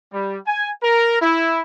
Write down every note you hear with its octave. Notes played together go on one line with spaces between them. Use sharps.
G3
G#5
A#4
E4